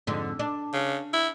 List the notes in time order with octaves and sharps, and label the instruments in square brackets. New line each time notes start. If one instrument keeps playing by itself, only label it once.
[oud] F2 G#2 D3
D4
[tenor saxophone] C#3
E4